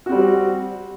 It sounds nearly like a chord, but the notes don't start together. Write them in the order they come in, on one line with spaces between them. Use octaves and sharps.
F#4 C4 G3